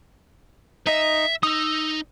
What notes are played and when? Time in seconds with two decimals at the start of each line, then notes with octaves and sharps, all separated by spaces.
0.87 D#4 D#5 E5
1.43 D#4 D#6 E6